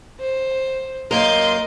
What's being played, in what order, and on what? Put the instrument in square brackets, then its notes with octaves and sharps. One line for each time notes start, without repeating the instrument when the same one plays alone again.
[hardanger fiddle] C5
[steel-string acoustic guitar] F#2 A#3 A#4 [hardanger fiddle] D#5 [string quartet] C6 G6 A6